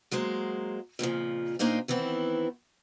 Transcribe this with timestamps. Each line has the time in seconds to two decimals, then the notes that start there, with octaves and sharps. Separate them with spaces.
0.11 F#3 G#3 A#3 C5
0.99 F2 A#2 C#3 F3
1.59 A#2 A#3 D4 D#4 C5 F5
1.88 D#3 E3 B3 C4 E4